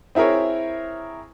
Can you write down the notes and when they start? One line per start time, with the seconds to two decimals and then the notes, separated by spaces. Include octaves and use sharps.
0.15 C4 E4 G#4 A#4 C#5